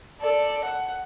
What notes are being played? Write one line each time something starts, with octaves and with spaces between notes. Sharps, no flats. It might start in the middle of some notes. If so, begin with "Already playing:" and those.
A4 D5
F#5